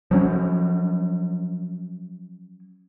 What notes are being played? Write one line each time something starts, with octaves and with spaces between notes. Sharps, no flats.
F3 F#3 C#4